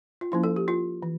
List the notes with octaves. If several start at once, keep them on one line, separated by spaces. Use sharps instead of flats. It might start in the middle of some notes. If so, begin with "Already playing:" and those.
F4
F3 A#3 C#4 E4
A4
G4
F4
E3